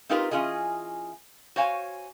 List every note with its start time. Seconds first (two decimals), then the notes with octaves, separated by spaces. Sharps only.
0.09 C4 D#4 F4 G4 A#4 B4
0.31 E3 C#4 F4 G#4 D#5
1.56 F#4 C5 C#5 F5 G#5